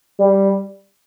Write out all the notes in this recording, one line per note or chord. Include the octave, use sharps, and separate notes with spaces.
G3